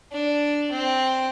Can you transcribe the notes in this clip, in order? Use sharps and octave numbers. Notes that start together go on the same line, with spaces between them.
D4
C4